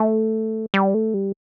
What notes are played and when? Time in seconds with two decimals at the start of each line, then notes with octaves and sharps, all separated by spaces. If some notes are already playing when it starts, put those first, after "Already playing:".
Already playing: A3
0.74 G3
0.94 A3
1.14 G3